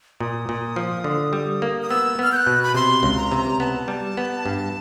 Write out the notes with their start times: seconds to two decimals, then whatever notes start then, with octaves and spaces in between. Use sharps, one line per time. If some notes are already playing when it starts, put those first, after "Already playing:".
0.20 A#2 D#6
0.49 A#2
0.76 F3
1.04 D3
1.33 G3
1.62 A#3
1.81 D#6
1.90 B3 E6
2.19 B3 F6
2.32 G6
2.36 F#6
2.47 B2
2.63 B5
2.74 C3 C6
3.03 C#2
3.17 A#5
3.32 C3
3.60 B3 A5
3.88 G3
4.17 B3
4.46 G2